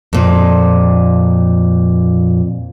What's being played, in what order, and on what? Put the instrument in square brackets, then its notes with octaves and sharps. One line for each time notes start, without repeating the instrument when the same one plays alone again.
[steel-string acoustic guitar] F2 A#2